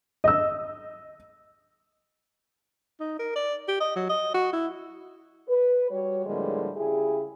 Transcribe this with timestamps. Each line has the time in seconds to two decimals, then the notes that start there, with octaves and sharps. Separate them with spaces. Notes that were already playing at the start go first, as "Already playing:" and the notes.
0.24 D#5 E6
3.00 D#4
3.19 A#4
3.36 D5
3.68 G4
3.80 D#5
3.96 F#3
4.10 D#5
4.34 F#4
4.53 E4
5.48 B4
5.90 G3 F#4 C#5
6.26 A2 D3 F3 G3 G#3 A#3
6.76 C#3 E4 G4 G#4